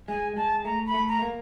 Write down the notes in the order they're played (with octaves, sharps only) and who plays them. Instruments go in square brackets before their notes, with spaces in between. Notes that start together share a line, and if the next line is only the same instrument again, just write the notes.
[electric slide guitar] G#3 [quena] G#5
[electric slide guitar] G#3 [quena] A5
[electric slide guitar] A3 [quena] A#5
[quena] B5
[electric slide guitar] A3
[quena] A#5
[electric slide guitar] A#3